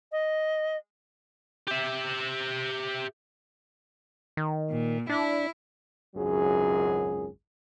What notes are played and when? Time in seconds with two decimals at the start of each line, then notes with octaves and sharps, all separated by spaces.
0.12 D#5
1.67 G4 E5
4.37 D#3
4.71 A#2
5.09 D4 E4
6.15 G#1 C#2 F#2 F#3 G#4